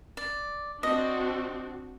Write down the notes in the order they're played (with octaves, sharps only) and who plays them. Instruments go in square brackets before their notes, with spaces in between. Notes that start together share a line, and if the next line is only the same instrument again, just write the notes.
[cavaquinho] D5
[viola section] C4 D4 F#4 [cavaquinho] D#5